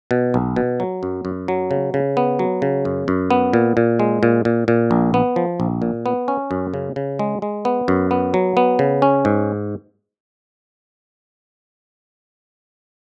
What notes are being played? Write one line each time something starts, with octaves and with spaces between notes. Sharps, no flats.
B2
B1
B2
F#3
F#2
F#2
F#3
C#3
C#3
B3
F#3
C#3
F#2
F#2
B3
A#2
A#2
G#3
A#2
A#2
A#2
A#1
B3
F3
A#1
A#2
B3
C#4
F#2
C#3
C#3
G#3
G#3
B3
F#2
B3
F#3
B3
C#3
C#4
G#2